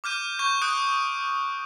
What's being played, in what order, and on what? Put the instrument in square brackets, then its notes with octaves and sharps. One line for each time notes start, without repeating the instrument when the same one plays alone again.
[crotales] D6 F6 G6 D#7
C#6 G6 D#7
D#6 F#6 G6 D7